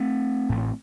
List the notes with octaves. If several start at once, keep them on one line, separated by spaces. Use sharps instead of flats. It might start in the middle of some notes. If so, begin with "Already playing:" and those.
Already playing: A3 C4
A1 A2